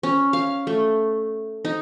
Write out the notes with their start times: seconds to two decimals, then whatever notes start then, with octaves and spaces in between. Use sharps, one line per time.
0.03 C#4
0.33 F5
0.67 A3
1.65 D#4